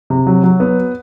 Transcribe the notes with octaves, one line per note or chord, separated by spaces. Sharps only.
C3
F#3
F#3
B3